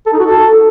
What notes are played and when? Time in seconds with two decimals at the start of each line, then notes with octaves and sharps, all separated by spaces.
0.06 A4
0.13 D#4
0.19 F#4
0.26 A4